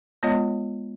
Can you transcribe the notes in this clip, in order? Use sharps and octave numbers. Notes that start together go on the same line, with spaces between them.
G#3 B3 F4 C#5 D#5